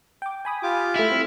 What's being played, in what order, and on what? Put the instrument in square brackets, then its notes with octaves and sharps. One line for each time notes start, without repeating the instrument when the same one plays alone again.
[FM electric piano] G5 D6
G#5 B5 D#6
[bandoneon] F4 G4 D6
[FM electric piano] A3 F6 [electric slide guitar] E4
[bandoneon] G3 [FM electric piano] C4